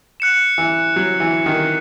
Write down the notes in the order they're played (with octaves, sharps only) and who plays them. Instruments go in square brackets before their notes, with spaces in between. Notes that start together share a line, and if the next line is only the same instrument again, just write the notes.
[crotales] F#6 C#7 E7
[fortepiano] E3
F#3
E3
D#3